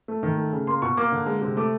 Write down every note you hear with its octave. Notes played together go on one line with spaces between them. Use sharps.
A3
D#3
A3
C#3
A#3 C6
B2 C#6
A#3 D6
D3
G#3
C3
A3 D6